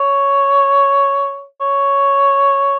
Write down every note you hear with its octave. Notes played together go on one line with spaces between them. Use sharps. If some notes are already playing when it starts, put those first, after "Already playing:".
Already playing: C#5
C#5